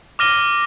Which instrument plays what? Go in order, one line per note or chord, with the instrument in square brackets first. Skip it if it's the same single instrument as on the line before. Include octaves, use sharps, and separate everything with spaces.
[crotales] D6 F6 A#6 D#7 G7